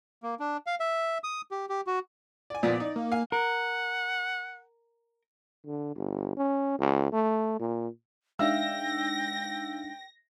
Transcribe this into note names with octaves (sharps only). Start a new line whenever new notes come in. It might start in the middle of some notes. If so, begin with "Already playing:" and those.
A#3
D4
F5
E5
D#6
G4
G4
F#4
D5 G#5
A#2 F3 B3 D5
D#4
A#3
F5 G#5
A#4 F#5
D3
G1
C#4
C#2
A3
A#2
G#3 D4 D#4 E5 F5 G5 E6 A#6